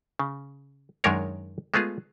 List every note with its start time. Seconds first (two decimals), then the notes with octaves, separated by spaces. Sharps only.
0.19 C#3
1.04 F#2 D#3 G#3 D4 A#4 C#5
1.74 G#3 A3 B3 F4 G#4